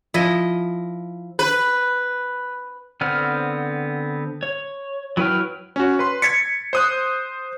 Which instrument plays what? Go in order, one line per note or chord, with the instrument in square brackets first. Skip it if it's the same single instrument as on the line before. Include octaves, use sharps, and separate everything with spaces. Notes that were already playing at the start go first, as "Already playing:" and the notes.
[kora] F3 [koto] E4 D#5
[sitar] B4
[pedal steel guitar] D3 B3 C4 F6
C#5
F#3 E4 B4 G5 F6
[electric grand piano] C#4 F#4
B4 C6
G#6 A6 B6 C#7
C5 D#6 F#6